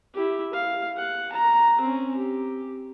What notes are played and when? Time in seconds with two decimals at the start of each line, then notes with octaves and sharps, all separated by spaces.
0.14 E4 G4
0.53 F5
0.97 F#5
1.33 A#5
1.81 C4 C#4
2.17 G4